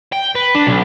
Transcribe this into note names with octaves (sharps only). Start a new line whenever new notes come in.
G5
B4
D4
B1